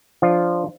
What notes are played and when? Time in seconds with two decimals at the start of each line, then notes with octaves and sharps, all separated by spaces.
0.22 F3 D4 F4